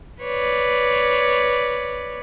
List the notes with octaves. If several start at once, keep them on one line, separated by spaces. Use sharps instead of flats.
B4 C#5 D5